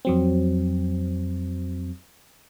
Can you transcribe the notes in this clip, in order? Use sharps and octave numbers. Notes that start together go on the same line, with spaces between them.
F2 F#3 C4